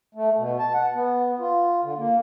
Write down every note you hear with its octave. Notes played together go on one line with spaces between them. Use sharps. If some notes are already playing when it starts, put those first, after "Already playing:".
A3
B2
A5
F#5
B3
F4
D3
A#3